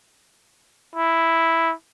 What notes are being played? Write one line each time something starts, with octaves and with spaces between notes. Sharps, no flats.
E4